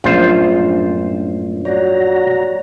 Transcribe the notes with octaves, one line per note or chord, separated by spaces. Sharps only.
A#1 F#2 A2 B3 C#4 D4 F4 C5
F#4 C#5 D5 F#5 A#5